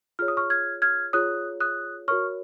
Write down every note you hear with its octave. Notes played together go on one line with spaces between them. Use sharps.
F4 G#4 C#5 F6
D#6
C#6 F6
F6 G#6
F6 G#6
F4 G#4 C#5 D#6 F#6
D#6 F#6
F#4 A#4 C#5 C#6 F6